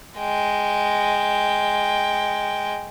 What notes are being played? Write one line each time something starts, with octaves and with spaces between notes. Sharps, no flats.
G#3 G5